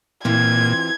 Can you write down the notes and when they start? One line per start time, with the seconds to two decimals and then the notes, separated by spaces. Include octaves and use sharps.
0.25 A#2 E3 C4 F4 G#6